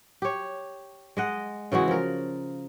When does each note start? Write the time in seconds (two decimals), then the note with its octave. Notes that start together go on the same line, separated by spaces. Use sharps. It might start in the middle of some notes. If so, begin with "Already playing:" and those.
0.22 G4 C#5
1.17 G#3 D#5 F#5
1.72 C#3 E3 G#3 F#4
1.88 F3 A#4